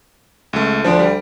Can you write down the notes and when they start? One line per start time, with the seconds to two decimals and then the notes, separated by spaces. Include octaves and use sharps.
0.53 C#2 A3
0.84 D2 F3 D4 D7
0.99 G3